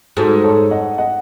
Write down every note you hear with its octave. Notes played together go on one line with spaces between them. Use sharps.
G#2 F#4 A4
A4 C#5
D#5 F#5
D#5 F#5